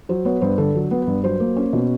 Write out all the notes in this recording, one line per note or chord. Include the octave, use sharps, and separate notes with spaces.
F#3 C5
B3 C#5
G2 C5
D3 A4
F#3
B3
B4
G2
F#3 C5
A#3
C#4
B2